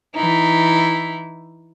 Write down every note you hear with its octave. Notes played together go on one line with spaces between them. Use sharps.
E3 D#4 E4